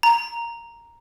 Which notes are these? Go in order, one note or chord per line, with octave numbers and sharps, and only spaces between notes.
A#5